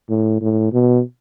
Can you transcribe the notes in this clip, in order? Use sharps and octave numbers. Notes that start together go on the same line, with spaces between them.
A2
A2
B2